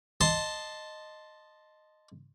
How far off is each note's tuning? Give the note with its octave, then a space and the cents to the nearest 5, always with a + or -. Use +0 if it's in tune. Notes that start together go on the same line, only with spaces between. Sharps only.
D#5 -5 A5 +0 C6 +0